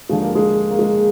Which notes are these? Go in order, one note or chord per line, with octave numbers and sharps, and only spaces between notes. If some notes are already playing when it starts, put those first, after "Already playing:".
D#2 D3 F3 G#3
A#3
G#3
A#3
G#3
A#3